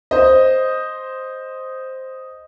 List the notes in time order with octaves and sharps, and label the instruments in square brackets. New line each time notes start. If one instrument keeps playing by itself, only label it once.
[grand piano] C5 D#5